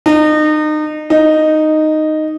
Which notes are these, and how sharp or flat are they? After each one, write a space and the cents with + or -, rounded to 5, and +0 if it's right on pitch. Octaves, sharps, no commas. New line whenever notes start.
D#4 -30
D#4 -5